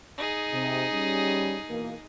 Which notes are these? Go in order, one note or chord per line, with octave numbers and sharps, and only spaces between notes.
D#4 G#4
C3
G3 C#4
B2 E3 A#3